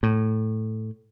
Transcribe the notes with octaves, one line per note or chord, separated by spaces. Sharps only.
A2